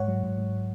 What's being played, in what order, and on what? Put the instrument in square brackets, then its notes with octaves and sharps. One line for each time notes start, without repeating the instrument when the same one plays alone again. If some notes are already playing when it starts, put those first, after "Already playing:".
Already playing: [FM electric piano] G#2 C#5 F#5
F#3
G#2
G#2